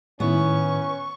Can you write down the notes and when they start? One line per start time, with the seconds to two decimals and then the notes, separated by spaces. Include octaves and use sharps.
0.20 A2 D#3 B3 C#4 E4 C#6